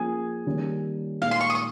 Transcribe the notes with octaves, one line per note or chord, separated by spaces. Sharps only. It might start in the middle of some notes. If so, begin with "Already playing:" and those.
Already playing: F3 A#3 C#4 G#4
D#3 G3 A#3 C#4
A#2 G#3 D#4 F5
C6
C#6
D#6
C#6